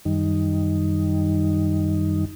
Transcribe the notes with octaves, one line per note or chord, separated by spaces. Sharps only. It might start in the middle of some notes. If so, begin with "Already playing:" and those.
F#2 D#3 G3 D#4